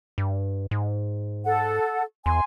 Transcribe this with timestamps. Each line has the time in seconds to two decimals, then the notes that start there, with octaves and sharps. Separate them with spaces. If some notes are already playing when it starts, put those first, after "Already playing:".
0.18 G2
0.71 G#2
1.45 A4 F#5
2.26 E2 G#5 C6